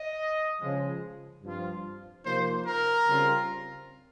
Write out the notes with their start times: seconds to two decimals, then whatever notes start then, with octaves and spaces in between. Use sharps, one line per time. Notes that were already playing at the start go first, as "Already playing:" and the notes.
Already playing: D#5
0.61 C#3 F3 G#3
1.43 G2 F3 C4 F4
2.25 C3 F3 A#3 D#4 C5
2.66 A#4
3.06 C#3 G3 C4 F4